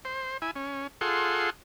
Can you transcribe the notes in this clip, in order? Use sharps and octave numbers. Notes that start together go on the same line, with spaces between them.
C5
E4 G#5
C#4
F4 G#4 A4 F#5 C6